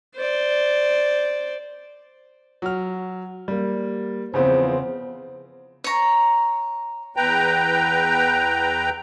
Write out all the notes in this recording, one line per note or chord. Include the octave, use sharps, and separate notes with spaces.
C5 D5
F#3 F6
G3 A#3
E2 C#3 F3 B3 C4 C5
C#5 A#5
E2 B4 G5 A#5